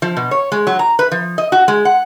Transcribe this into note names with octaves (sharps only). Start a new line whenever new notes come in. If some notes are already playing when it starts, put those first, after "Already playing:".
F3
B2
C#5
G#3
F#3
A#5
B4
F3
D#5
F#4
G#3
F#5